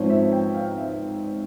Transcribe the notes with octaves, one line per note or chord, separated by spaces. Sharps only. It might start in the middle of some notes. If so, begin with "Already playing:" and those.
Already playing: G#2 F3 C4 C#5
E5
G5
F5
E5